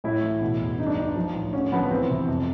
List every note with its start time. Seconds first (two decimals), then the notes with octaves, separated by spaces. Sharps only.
0.04 A2 E4
0.22 E3
0.41 B2
0.60 E2
0.78 G2 D#4
0.87 D4
0.96 G2 D#4
1.16 F3
1.34 A2
1.53 D3 C#4
1.72 F3 B3
1.91 E3 C4
2.09 C3
2.28 F2